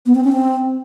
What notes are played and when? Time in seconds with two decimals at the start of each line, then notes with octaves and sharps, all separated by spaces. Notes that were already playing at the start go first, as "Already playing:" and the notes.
0.06 B3
0.15 C4
0.24 C#4
0.33 C4